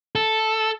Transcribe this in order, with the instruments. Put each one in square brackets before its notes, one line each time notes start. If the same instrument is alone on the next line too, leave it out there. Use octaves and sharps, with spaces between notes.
[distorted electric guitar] A4